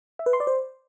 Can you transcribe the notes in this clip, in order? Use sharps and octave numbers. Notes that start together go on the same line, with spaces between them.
E5
B4
C6
D5
C5